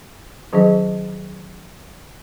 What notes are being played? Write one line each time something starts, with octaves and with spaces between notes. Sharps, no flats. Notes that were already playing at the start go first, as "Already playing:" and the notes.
D#3 F#3 C#4 G#4 D#5